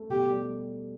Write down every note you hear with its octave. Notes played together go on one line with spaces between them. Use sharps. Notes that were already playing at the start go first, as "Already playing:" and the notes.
Already playing: A3
B2 G4
G3